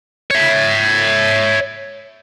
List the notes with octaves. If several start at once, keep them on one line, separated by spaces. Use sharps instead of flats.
C#5 E5